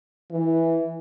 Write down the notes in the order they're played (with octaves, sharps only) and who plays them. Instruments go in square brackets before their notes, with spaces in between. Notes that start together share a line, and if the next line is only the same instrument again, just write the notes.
[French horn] E3